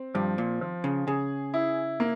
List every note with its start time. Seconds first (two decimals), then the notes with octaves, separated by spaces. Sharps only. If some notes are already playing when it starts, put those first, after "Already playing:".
Already playing: C4
0.15 G2 F3
0.38 A#2
0.61 F3
0.84 C#3
1.07 C#3 G#4
1.54 E4
2.00 A#3